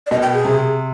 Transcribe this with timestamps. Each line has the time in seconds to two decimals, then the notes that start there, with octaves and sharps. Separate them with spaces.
0.07 D5
0.11 B2 D#5
0.22 G5
0.34 G#4
0.45 C3